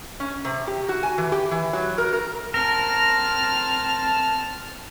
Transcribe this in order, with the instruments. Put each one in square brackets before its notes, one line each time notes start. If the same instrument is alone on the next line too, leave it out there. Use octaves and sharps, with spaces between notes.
[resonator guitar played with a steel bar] C#4
C3
G4
F#4
G#5
E3
G4
E3
F#3
A#4
A#4
[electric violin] C4 F6 [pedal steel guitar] A#4 [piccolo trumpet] A5